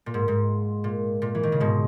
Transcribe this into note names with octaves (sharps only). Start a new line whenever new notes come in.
A#2
G#2
G#2
A#2
A#2
E3
D#3
C#3
G#2 B2